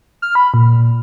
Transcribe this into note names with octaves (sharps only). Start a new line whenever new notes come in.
F6
B5
A#2